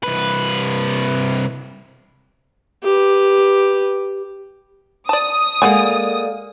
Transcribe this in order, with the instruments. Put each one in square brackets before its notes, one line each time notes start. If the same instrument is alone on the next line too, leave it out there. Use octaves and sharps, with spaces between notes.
[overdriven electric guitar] C2 B4
[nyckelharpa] G4 B4
[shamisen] D5 A5 [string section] D#6
[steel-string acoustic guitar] G#3 A#3 [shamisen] G#4 F#5 G#5 [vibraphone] A4 D5 F5